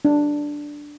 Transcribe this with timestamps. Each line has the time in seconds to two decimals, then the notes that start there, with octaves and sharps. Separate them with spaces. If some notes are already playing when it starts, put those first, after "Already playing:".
0.05 D4